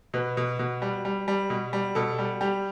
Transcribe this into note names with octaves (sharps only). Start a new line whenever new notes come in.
B2 B4
B2
B2
G3
G3
G3
B2
G3
B2 A4
G3
G3 G4